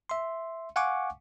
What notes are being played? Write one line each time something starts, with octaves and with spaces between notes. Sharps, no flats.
E5 C6
F5 F#5 G#5 C#6 D6